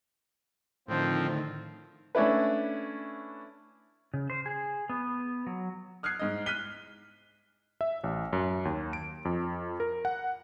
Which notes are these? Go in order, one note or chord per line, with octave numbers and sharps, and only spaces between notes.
A2 D3 D#3 F3 C4
A3 C#4 D4 E4 B4
C#3
C5
G#4
B3
F#3
D#6 F6 F#6 G#6 C7
G#2 D#5
F6 F#6 B6 D#7 G7
E5
A1
F#2
D#2
D7
F2
A#4
F#5